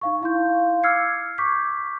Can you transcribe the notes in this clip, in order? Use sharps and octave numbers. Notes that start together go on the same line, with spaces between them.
D#4 F5 C#6
E4 F5 C6 G6
D6 E6 F6 G#6 C7 C#7
C#6 D6 G6 B6